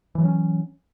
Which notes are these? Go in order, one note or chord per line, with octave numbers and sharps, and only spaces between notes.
E3 F#3 C#4